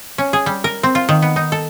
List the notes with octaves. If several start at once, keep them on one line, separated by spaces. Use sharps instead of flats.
C#4
G#4
G3
A#4
C4
F4
D#3
B3
D#4
A4